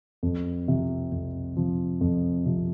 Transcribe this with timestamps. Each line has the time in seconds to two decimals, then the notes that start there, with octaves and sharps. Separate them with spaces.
0.23 F2
0.68 C3 F3
1.12 F2
1.57 C3 F3
2.01 F2
2.46 C3 F3